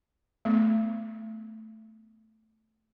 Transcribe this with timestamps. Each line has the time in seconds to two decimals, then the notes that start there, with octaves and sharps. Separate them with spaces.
0.45 A3 B3